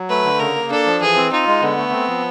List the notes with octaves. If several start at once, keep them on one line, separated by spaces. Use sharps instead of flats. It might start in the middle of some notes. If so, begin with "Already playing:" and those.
Already playing: F#3
A3 B4
D3
C#3 A#4
A#3
D4 A4
F3
E3 G#4
C4
D#4 F4
G#3
D3 B3
A3
C4
F3